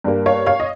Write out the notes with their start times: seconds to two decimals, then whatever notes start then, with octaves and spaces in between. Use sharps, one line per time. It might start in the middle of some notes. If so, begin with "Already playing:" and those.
0.04 G2 G3 A#3
0.26 C#5 F5
0.46 C#5 F5
0.60 D#5